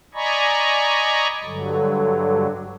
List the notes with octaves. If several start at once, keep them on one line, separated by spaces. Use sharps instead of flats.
D5 D#5 G#5 A#5 B5 C#6
G2 D3 F#3